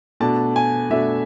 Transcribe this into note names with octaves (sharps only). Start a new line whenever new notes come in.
B2 A3 D4 A5
G#5
B2 A3 D4 E5